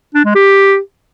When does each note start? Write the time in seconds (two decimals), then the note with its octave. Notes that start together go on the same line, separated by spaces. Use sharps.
0.15 D4
0.25 G#3
0.35 G4